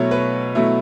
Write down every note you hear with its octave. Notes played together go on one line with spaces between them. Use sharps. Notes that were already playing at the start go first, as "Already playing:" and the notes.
Already playing: B2 F#3 A3 E4 C#5
B4
B2 F#3 A3 E4